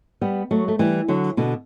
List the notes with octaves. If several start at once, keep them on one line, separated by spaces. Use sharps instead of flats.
G3 B3
F#3 A3
A3
E3 G3
D3 F#3
B2 D3